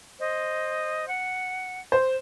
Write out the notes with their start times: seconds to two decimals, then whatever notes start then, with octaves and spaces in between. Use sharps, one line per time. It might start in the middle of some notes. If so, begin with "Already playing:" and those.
0.20 C5 D#5
1.08 F#5
1.92 C5